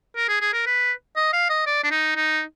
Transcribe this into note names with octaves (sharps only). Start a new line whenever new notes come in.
A#4
G#4
G#4
A#4
B4
D#5
F5
D#5
D5
D4
D#4
D#4